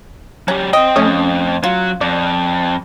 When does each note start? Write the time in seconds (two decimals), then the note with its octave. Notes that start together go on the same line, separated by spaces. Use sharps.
0.48 F#3 C#4 G4
0.73 C4 D#5 G5
0.96 F2 A3 C#4 D#6
1.64 F#3 F4
2.01 F2 D5